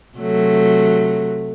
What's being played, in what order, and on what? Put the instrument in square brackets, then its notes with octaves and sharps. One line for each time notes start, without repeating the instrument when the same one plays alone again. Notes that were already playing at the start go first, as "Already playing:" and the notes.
[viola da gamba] C3 F#3 A3